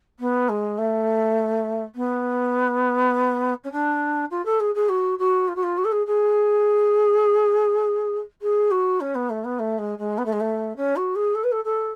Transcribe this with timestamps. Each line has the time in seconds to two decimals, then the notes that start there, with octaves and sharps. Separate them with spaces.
0.20 B3
0.49 G#3
0.78 A3
1.95 B3
3.64 C#4
3.72 D4
4.31 F4
4.45 A4
4.60 G#4
4.75 G#4
4.89 F#4
5.19 F#4
5.48 F4
5.56 F#4
5.63 F4
5.78 F#4
5.85 A4
5.92 G#4
6.07 G#4
8.42 G#4
8.71 F#4
9.01 C#4
9.15 B3
9.30 A3
9.44 B3
9.59 A3
9.79 G#3
9.98 G#3
10.18 B3
10.26 A3
10.33 G#3
10.40 A3
10.77 C#4
10.96 F#4
11.16 G#4
11.35 A4
11.44 B4
11.52 A4
11.64 A4